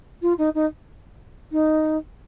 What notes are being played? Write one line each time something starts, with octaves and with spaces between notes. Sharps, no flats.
F4
D#4
D#4
D#4